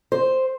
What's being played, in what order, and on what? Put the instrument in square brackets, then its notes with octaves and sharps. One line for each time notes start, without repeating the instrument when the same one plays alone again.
[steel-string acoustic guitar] C5